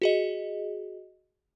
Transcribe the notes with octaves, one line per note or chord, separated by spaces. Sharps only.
F#4 G#4 D#5